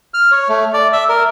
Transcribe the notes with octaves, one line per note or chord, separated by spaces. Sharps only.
F6
C#5
A3
D5
E5
A#4